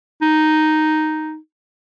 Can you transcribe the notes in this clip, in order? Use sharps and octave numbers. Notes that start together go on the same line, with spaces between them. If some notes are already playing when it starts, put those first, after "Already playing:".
D#4